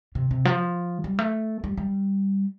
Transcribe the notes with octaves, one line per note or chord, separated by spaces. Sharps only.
C3
C3
F3
G3
A3
G3
G3